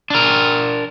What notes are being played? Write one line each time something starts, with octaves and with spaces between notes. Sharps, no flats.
D4 A#4